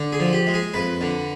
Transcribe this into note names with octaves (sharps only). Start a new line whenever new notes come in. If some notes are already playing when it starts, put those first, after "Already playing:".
Already playing: D3
G#4
F3
G4
G#3
G#4
F2 B4
D3